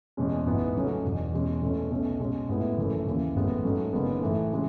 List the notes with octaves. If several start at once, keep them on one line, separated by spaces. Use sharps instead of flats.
E2 B2 G#3 C#4
A1 G#2 E3 B3 D#4
C#2 C#3 F#3 A3 C#4
E1 E2 B2
E2 B2 G#3 C#4
E2 B2 A3 C#4
B1 B2 A3 C#4
B2 G#3 C#4
A2 G#3 B3 E4
G#1 F#2 E3 A3
D#2 C#3 E3
A1 A2 G#3 B3
G#2 F#3 A3 C#4
F#1 F#2 D#3 G#3 B3
A2 E3 A3
C#3 E3 G#3